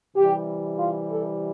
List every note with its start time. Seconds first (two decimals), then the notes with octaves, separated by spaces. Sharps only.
0.16 C3 E3 G3 G4
0.79 F4
1.11 A4